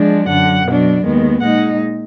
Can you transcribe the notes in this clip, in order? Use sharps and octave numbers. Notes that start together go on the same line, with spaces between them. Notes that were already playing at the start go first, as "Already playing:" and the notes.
Already playing: F3 G#3 D4
F#2 D3 F#3 F#5
B2 F#3 D4
D#2 D#3 G#3 B3
A#2 G#3 D#4 F#5